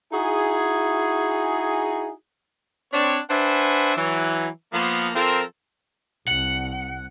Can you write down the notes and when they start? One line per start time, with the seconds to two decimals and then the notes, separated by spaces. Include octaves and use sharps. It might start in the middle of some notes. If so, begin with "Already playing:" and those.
0.13 D#4 E4 F#4 G#4
2.93 C4 D4 C#5
3.30 D4 B4 C5 E5 F#5 G#5
3.96 E3 F#3
4.73 F3 A#3 B3
5.15 F3 C4 F4 A4 A#4
6.27 C2 F#5